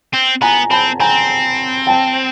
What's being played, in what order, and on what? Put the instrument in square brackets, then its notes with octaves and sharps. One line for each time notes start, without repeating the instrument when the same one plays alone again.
[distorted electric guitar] C4
[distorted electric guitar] B3 [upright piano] G#5 A#5
[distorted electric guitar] C4 [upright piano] A5 B5
[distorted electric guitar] C4 [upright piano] G#5 A#5
[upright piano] G5 A5